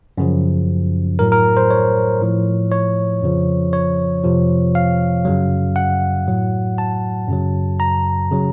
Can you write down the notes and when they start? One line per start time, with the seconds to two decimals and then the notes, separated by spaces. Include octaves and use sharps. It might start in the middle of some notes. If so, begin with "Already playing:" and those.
0.18 F#2 C#3 F3
1.19 A2 F#3 A#4
1.32 A#4
1.57 C5
1.71 C#5
2.21 A2 F3
2.72 C#5
3.22 F2 C#3 F3
3.73 C#5
4.24 F2 C3 F3
4.75 F5
5.25 F#2 C#3 F#3
5.76 F#5
6.27 A2 F#3
6.78 A5
7.28 F#2 C#3 F#3
7.80 A#5
8.32 C#3 F#3